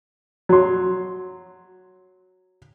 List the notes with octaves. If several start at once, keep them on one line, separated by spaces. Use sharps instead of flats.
F#3 C6